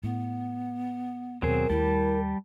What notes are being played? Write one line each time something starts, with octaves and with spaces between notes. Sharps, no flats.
A2 B3
D#2 B2 F#3 C4 G#4 A#4
D#2 G3 A3 E4 G4 A5